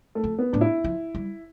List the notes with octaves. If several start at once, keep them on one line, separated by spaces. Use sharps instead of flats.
A3
F2
B3
A2 D4
E4
F3
G3